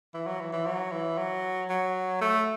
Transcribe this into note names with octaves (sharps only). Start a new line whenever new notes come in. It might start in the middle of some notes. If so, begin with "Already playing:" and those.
E3
F#3
E3
E3
F#3
E3
F#3
F#3
A3